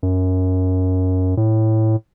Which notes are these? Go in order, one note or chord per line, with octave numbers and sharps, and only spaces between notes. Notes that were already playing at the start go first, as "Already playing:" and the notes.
F#2
A2